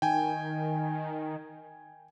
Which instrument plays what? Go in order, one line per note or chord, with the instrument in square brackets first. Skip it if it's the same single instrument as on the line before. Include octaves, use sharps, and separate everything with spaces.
[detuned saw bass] D#3 [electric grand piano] G5 G#5